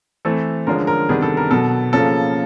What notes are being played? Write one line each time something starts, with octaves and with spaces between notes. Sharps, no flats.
E3 A3 C4 A4
D3 F3 G#3 C#4 A#4
A#4
C3 D#3 G3 B3 D4 G#4
A4
A#4
B2 F#3 B3 A4
C#3 F3 A#3 C#4 A4